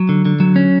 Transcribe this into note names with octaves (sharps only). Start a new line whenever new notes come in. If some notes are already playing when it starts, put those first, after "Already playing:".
Already playing: F#3
D3
D3
F#3
C#4